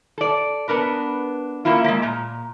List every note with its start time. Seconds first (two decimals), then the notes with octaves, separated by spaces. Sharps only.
0.18 A4 D5
0.68 B3 D4 A#4 B4
1.65 A#3 C#4 E4 F4
1.84 G#3 A#3
2.02 A#2 A#5